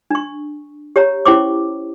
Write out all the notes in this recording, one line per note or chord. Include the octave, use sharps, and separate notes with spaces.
D4 C#6
G4 C#5 A#5
C#4 E4 G4 C5 C#6 D6